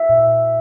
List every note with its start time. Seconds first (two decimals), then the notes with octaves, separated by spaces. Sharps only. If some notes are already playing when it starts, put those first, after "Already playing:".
Already playing: E5
0.09 A#2